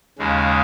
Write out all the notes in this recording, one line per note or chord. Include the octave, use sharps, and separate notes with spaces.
D#2 C#3 G#3